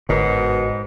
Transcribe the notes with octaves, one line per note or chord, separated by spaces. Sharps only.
G1 G#2 B2 F#4 A#4 C#5